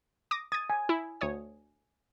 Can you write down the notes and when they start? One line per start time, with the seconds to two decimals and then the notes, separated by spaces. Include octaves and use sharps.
0.31 D6 D#6 A#6
0.52 D#6 G#6 A6
0.70 G#5
0.89 E4
1.21 D2 C#5 D#6